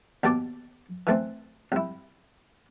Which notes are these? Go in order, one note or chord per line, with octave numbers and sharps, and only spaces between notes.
D#2 B2 A5 D6
E3 A3 C4
C2 E4